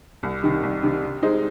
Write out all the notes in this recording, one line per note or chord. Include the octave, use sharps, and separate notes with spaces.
C2
C3 D#3
C2
C3 D#3
C3
G#3 D#4 G#4 C5